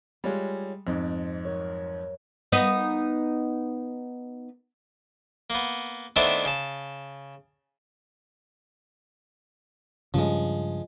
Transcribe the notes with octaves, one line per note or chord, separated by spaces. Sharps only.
G3 G#3 F4 C#5 D#5
F2 G#2 C4
F#3 A#4 C#5
B3 D#4 D#5
A#3 B3
D#3 A3 B3 C4 D4 E4
C#3 A5
G2 C#3 F3 G#3